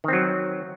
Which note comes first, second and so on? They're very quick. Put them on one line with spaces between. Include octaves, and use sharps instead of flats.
D#3 C4 F#3